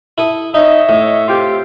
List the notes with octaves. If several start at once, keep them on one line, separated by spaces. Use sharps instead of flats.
E4 A4 D#6
D#4 C#5 D#5 E5
A2
C3 F4 G4